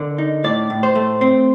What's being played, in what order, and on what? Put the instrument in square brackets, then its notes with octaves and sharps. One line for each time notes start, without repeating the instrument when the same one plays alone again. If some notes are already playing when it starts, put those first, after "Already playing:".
Already playing: [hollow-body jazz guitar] D3 A#4
D#4
A2 D5
A2
C5
A3
C4